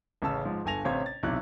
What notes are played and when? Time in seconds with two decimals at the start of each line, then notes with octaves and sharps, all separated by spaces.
0.22 A1 C#3 A5 E6
0.45 G#2 F3
0.65 G1 G2 A4 G#5 A#6 F7
0.84 A1 C3 C5 C#5 F5 G#6
1.06 A6
1.23 B1 C3 E4 F#6